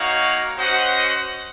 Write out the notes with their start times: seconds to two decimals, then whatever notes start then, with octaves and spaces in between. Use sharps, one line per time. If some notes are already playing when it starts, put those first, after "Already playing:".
Already playing: A#3 D#4 F#4 C#5 F5
0.57 C#4 F#4 C5 D#5 F#5